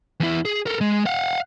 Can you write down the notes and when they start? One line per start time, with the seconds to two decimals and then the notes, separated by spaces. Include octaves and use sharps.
0.20 E2 E4
0.45 G#4
0.66 A4 A#4
0.81 G#3
1.06 F5 F#5